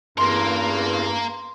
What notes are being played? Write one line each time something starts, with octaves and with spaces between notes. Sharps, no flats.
A1 E2 G2 A#3 A#4 C6